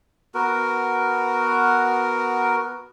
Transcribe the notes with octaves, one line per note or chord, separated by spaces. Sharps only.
B3 F#4 A#4